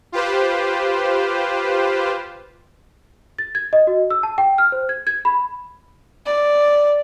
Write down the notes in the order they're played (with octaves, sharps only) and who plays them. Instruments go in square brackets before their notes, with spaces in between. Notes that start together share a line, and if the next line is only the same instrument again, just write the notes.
[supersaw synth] F4 G4 B4 C5
[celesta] A6
G#6
D#5
F#4
E6
A5
G5
F6
C5
G#6
G#6
B5
[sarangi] D5